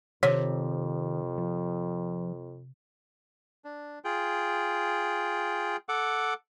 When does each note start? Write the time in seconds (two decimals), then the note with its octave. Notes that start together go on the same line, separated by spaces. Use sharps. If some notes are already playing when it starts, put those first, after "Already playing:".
0.23 F2 C3 D#3 C#5
1.38 F3
3.65 D4
4.04 F4 G#4 G5
5.89 A4 F#5 D6